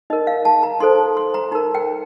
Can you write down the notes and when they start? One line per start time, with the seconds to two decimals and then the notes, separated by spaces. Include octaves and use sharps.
0.10 D#4 A#4 D#5
0.27 F5
0.45 A5
0.63 A#5
0.80 D#4 A4 C5 C6
1.17 C6
1.34 A#5
1.51 D#4 A#4 A#5
1.75 G5